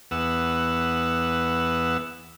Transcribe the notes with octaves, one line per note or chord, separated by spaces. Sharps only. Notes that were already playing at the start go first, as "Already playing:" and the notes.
E2 B3 F#5 E6